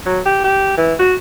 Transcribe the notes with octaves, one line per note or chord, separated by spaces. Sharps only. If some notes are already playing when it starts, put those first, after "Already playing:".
F#3
G4
G4
E3
F#4